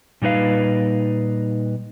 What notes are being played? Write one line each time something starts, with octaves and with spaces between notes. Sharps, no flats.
A#2 G3 D#4 B4 F5